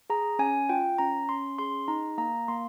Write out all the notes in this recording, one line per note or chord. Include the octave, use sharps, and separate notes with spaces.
G#4 A#5
C#4 G#5
F4 G5
C#4 A#5
C#4 C6
G#4 C6
D#4 A#5
A#3 A#5
A#3 C6